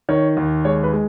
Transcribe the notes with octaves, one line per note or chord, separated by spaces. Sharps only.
D#3 C#5
D#2
G#3 C#5
B4
G#3